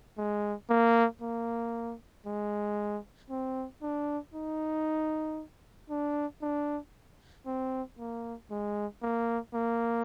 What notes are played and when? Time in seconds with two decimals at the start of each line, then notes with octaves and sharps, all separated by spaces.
0.18 G#3
0.70 A#3
1.22 A#3
2.26 G#3
3.30 C4
3.82 D4
4.34 D#4
5.90 D4
6.42 D4
7.46 C4
7.99 A#3
8.50 G#3
9.02 A#3
9.54 A#3